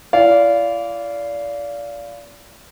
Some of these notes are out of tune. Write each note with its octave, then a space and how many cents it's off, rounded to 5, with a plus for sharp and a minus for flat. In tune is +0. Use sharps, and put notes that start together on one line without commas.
E4 +40 D5 -25 F5 -10